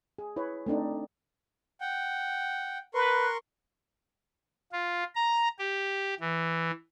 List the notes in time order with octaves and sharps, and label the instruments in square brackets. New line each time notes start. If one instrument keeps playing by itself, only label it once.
[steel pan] G#4
E4 B4 C#5
A3 C4 D4 D#4
[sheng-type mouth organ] F#5 G5
[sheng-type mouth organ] A#4 C6 C#6 [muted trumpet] B4
[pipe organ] F4
A#5
G4
E3